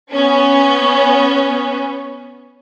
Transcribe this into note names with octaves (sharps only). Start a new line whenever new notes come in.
B3 C#4